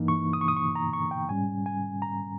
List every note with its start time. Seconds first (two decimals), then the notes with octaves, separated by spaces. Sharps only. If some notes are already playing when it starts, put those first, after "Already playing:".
Already playing: G2 E3 A#3 D#4
0.08 C#6
0.33 D#6
0.41 C#6
0.48 D#6
0.57 C#6
0.75 A#5
0.93 C#6
1.11 G5
1.29 G#2 G3 C#4 G#5
1.66 G#5
2.02 A#5